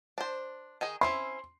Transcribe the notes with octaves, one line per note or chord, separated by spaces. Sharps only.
D4 C5
D#3 D#4 G#4
C4 C#4 E4 C6